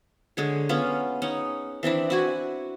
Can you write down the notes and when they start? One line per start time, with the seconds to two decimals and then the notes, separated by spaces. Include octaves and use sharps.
0.37 D3 G#3 C#5
0.69 B3 C#4 F4
1.22 C#4 D#4 F#5
1.83 E3 C4 D4 E4
2.10 E4 F#4 G#5